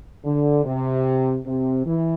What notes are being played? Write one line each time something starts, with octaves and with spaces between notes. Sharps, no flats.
D3
C3
C3
E3